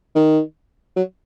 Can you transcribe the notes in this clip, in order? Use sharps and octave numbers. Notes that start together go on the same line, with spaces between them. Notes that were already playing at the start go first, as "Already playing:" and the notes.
D#3
F#3